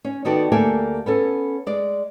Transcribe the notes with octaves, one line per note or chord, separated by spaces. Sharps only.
C#4
D#3 B3 F#4 G4 A4 D5
D2 A#3 G4 A4 E5 G#5
B3 C#4 A4
G#3 D5